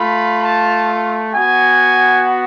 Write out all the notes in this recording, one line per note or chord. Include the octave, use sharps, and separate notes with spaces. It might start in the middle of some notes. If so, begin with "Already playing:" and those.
Already playing: A3 F4 B5
A5
B3 F#4 G#5